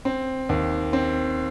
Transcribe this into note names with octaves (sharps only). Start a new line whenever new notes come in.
C4
D#2
C4